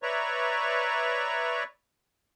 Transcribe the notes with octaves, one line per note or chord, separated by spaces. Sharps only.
B4 C#5 D5 E5 A#5 C#6